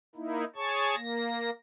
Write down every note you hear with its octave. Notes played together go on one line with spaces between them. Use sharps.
A#3 D#4 E4
G#4 C#5 A5 C#6
A#3 A#6